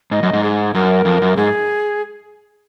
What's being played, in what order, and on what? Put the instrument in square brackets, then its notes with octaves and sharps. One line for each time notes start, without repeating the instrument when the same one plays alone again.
[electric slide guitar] G#2 [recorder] D#5
[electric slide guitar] F#2
G#2
[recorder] G#4
[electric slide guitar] F#2 [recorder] A#4
[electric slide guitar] F2
F#2
[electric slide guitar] G#2 [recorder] G#4